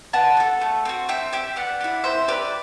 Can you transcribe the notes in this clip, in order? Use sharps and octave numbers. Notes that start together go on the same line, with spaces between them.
B3 F#5 A5
F#4
A4
A3
C4 F#4
C4 E5 G5
G4 E5 G5
B3 D5 F#5
G4
E4
C4 C5 E5
G4 B4 D5